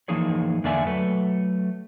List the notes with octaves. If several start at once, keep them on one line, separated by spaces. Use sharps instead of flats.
E3 F3 A#3 D#4 G#4 C#5
E2 D3 A#3 D5 E5 G#5
F#3 A3 A4 B4